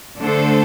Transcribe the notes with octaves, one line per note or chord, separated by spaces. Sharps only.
D3 A3 D4 A4 C5